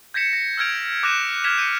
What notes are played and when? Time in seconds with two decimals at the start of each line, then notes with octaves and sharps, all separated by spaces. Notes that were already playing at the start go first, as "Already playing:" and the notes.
0.14 G6 G#6 A#6 B6 C#7 E7
0.33 A#6
0.57 E6 F6 G6 G#6 D7 F7
1.03 D6 F#6 G#6 A#6 D#7 E7
1.44 F6 G#6 B6 E7 F7
1.58 G6 C#7 D#7